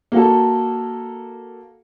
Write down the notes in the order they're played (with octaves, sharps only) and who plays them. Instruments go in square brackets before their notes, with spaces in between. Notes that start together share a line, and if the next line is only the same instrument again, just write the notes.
[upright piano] A#3 F#4 A4